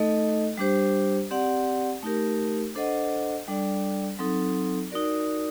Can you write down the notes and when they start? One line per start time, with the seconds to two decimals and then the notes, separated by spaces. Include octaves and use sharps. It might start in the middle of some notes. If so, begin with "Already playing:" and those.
Already playing: A3 D#4 A4 D#5
0.58 G3 D4 G4 C5
1.31 C4 G4 D5 F#5
2.03 A3 D#4 G4 A#4
2.75 D4 A4 C5 D#5 F#5
3.48 G3 D4 A4 D5
4.19 F#3 C4 D#4 A4
4.92 D#4 F#4 A#4 D5